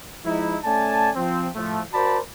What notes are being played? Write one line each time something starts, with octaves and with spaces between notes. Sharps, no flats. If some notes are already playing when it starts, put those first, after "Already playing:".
F3 G#3 D#4 E4
A3 C#4 D5 G#5 A5
F3 C4
A2 F3 A3
F#4 A#4 C5 D5 A5 B5